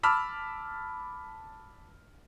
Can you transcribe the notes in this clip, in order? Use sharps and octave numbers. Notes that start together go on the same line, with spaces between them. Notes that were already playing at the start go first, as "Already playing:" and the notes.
A5 B5 D6 E6 F6